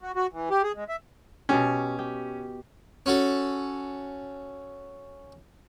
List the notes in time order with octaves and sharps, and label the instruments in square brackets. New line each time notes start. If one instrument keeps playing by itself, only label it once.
[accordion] F#4
F#4
E3
G4
G#4
G#3
E5
[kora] B2 G4 [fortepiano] C#4
[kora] G4
[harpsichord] C#4 F#4 A4